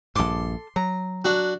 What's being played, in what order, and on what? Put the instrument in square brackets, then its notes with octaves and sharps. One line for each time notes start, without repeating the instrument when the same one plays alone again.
[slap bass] A#1 G2 [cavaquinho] A4 D6 [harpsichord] C6
[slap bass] F#3 [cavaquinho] A#5
[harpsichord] D4 F#4